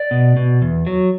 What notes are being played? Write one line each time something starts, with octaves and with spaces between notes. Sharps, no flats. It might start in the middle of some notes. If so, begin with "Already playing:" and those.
Already playing: D5
B2
B2
E2
F#3